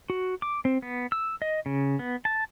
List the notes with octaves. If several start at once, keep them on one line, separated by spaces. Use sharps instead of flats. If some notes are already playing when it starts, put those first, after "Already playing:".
F#4
D6
C4
B3
E6
D#5
C#3
B3
A5